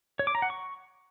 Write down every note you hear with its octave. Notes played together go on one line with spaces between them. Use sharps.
C#5
D6
A#5
F#5
C#6